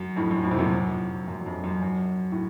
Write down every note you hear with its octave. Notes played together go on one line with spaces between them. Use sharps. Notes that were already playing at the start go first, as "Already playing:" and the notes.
Already playing: F#2
F2 A2
F#2
F2 A2
C3
F#2 A#2
F#2
F#2
F#2
F2
F#2
F#2
A2